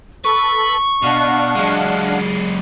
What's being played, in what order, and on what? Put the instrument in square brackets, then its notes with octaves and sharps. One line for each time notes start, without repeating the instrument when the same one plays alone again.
[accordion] A4 [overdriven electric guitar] B4 [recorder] C#6
[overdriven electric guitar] B2 [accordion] D4 F5 F#5
[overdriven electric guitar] F#3 G#3